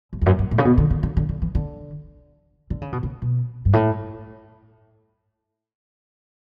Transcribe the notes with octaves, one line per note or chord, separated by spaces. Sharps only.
G2
E2
F#2
F#2
A2
C#3
B2
D3
D3
D3
D3
D3
E3
D3
D3
C#3
B2
C#3
B2
G2
A2